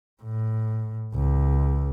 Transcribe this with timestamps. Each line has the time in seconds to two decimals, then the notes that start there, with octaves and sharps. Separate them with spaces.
0.23 A2
1.14 C#2